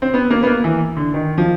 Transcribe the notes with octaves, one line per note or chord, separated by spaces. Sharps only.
C4
B3
A#3
B3
A#3
E3
D3
D#3
F3